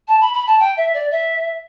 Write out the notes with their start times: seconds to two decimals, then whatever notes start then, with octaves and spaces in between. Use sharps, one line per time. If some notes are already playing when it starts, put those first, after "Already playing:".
0.08 A5
0.21 B5
0.34 B5
0.47 A5
0.60 G5
0.77 E5
0.94 D5
1.11 E5